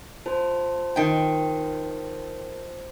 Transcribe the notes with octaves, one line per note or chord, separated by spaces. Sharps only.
F4 C5 A5
D#3 G5